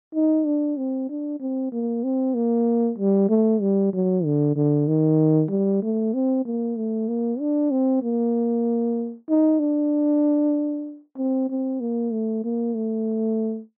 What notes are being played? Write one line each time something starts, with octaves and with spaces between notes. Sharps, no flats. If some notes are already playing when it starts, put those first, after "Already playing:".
D#4
D4
C4
D4
C4
A#3
C4
A#3
G3
A3
G3
F#3
D3
D3
D#3
G3
A3
C4
A#3
A3
A#3
D4
C4
A#3
D#4
D4
C4
C4
A#3
A3
A#3
A3